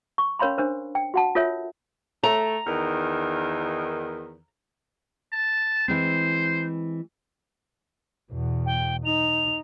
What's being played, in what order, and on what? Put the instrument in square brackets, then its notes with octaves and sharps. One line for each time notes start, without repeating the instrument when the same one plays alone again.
[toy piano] C#6
C#4 A#4 C#5 F5 B5 C6
D4 A#4 C5
G5
F#4 F#5 A5
F4 A4 A#4 C#5 E5
[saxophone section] A3 [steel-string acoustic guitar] A#5
[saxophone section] E2 D#3
[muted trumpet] A5
[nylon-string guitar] E3 G#3 C4 [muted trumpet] C5
[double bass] E2 B2
[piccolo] G5
[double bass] D#4 [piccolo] F7